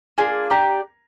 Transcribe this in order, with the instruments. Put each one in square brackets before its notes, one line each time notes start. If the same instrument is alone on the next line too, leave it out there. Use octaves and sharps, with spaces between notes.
[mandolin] A#3 D4 F4 G#4 [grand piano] G#5
[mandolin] D4 G4 D5 [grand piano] A#5